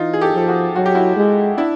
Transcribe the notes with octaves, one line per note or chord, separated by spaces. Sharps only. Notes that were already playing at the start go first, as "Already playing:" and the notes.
Already playing: E3 D#4 F4
G#4
G4 A4
F3 A4
F#4 G#4
F#3 F#4
G4
E4 F#4
G#3
D4 E4